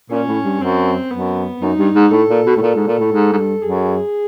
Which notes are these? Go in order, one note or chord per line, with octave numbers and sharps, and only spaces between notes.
A#2 C#4
A2
G2
F#2 C4
F#2 B3
F#2 D#4
G2
G#2
A2 A4
A#2
B2
A2
A#2 A4
G#2
A#2
A2
G#2
G#2
G2
F#2 G#4